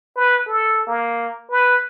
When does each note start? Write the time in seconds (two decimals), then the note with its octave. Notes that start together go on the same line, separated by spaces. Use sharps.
0.16 B4
0.47 A4
0.87 A#3
1.51 B4